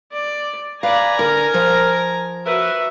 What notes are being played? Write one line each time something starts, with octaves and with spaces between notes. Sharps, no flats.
D5
B4 D5 F5 G#5 A#5
D3 A#4
F3
F#4 A#4 B4 E5